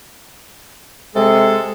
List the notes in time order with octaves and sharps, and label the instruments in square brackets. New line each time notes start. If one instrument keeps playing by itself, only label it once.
[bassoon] C3 [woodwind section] G#3 G#4 A4